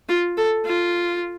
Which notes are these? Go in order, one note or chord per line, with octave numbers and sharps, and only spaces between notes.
F4
A4
F4